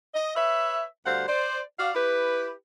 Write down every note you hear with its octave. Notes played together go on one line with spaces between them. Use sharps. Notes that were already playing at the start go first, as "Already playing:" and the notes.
D#5
B4 C#5 E5
D2 G3 C5 F5 F#5
C5 D5
F#4 D5 F5
E4 G4 B4